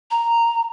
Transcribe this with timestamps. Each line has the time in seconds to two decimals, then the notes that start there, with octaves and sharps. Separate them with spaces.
0.11 A#5